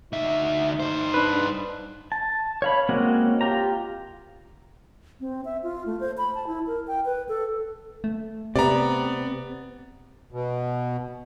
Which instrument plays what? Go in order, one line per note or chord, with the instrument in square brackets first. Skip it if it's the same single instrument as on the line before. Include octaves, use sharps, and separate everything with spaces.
[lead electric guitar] D2 E5 [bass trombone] D#4
[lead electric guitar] G2 C5
[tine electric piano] D4 B4
[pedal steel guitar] A5
C#5 F5 B5
G#3 A#3 C4 C#4 F#4
F4 G4 A#5
[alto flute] C4
E5
F4
A3
C5
B5
A5
E4
A#4
G5
B4
A4
[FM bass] A3
[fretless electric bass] C3 [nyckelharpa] B3 [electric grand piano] D5 A#5
[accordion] B2